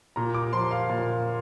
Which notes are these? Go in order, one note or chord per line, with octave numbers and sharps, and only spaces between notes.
A#2 A#5
D6
F3 C6
F5
A#2